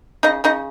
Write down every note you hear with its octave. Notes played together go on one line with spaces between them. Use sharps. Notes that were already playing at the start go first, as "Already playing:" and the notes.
C#3 D#4 D#5
C#3 D#4 D#5